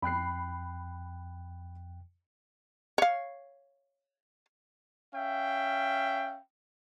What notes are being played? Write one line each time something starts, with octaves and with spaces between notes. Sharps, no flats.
F2 G5 B5 F#6 C7
C#5 F5
C#4 E5 F5 G5